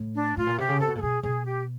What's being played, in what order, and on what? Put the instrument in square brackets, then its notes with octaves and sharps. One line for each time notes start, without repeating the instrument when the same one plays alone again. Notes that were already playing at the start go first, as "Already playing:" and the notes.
Already playing: [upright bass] A2
[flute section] D4
[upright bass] A2 [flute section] F4
[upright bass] A#2
[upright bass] C3 [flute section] G4
[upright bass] C#3
[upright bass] C3 [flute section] A4
[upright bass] B2
[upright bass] A#2 [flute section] A4
[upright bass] B2 [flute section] G#4
[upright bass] B2 [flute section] G#4
[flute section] G4